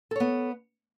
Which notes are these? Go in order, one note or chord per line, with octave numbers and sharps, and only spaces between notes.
B3 A4 C#5